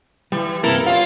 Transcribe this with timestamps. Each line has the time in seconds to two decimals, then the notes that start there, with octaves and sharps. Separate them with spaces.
0.32 E3 G3
0.63 G2 C3 A#3 E4 A4 A#4
0.86 F4 G4 C#5 F5